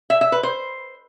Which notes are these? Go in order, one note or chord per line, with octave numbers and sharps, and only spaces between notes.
E5
E5
B4
C5